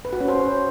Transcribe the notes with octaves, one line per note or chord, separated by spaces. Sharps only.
B4
F#4
C#4
C5